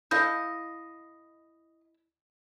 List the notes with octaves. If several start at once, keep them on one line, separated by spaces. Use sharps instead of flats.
E4 A4 D#5 F5 G6